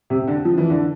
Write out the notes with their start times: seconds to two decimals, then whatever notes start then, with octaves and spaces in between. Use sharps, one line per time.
0.10 C3
0.28 D3
0.45 F3
0.58 E3
0.70 D3